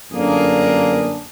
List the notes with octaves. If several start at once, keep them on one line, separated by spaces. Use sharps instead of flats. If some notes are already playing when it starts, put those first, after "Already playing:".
G1 F#2 A#3 D4 G#4